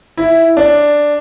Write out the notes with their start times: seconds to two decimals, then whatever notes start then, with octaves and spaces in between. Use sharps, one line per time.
0.17 E4
0.57 D4